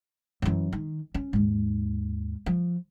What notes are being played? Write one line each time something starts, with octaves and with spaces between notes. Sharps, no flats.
F#2 E3
D#3
C#4
D#2 G#2
F3